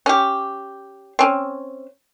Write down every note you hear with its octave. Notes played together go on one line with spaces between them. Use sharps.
C#4 G4
C4 C#4